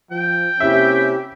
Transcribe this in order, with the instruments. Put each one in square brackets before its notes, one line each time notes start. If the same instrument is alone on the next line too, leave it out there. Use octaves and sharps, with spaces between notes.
[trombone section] F3 [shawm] G5
[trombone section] C3 A#3 C#4 [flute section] E4 G4 [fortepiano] E5